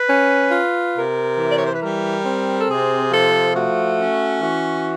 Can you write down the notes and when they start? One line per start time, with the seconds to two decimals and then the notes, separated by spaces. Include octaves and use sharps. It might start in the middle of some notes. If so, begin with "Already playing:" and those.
Already playing: B4
0.08 C#4
0.51 F4
0.95 C3 A#4
1.38 E3
1.49 D5
1.58 C#5
1.66 C5
1.73 B4
1.81 G3 A#4
2.25 C4
2.60 A4
2.69 C3 G#4
3.12 F3 A4
3.55 A3 F#4
3.98 C#4
4.41 E3 F#4